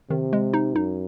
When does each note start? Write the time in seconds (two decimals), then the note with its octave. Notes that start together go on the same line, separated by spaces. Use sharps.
0.10 C3 D#3
0.33 G#3
0.54 D#4
0.75 F#2 D#4